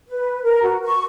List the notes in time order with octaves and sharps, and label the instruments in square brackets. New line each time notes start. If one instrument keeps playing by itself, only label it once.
[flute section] B4
A#4
F#4
C#6